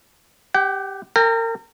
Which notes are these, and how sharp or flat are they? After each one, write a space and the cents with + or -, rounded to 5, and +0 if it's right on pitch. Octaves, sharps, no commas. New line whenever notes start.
G4 +5 F#5 +45
A#4 -35 G5 +25 A#5 +0